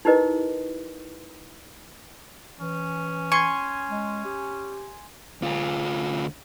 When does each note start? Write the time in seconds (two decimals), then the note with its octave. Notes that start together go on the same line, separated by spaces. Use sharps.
0.05 D#4 E4 G4 A#4 B4 D#5
2.60 E3 C#4
3.32 G#5 C6 C#6 G#6
3.90 G#3
4.25 G4
5.42 D2 F4